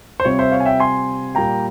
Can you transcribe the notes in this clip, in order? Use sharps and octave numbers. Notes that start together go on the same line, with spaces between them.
C5
C3 G3 C4 F4 C#5
C5 E5
C#5 F5
G#5
E5 G5
G#5 C6
A#2 G3 A#3 F4 G5 A#5